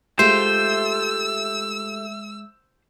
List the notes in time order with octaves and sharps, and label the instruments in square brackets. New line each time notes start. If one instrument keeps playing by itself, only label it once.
[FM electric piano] G#3 E5 [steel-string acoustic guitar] A3 F4 G4 [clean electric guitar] C5 [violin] E6